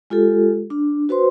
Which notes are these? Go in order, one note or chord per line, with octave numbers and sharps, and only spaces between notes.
G#3 F4 G4 A4
D4
F#4 B4 C5 C6